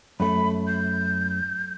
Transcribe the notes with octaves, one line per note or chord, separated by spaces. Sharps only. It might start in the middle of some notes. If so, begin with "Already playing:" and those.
F#2 A3 B5
G6